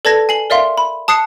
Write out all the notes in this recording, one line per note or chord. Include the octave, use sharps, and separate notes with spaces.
A4 B4 D5 A5 G#6 A#6
G#5 C7 F#7
A#4 D5 E5 F5 C6
B5
A5 D#6 F#6 C7 C#7